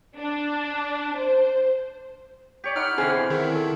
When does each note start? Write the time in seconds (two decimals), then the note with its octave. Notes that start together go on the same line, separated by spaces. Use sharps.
0.17 D4
1.15 C5
2.64 G4 C#5 D5
2.76 D#4 F#5 G5 B5 F6
2.98 B2 D3 E3 C4 G#4
3.30 D#3 E4
3.55 A4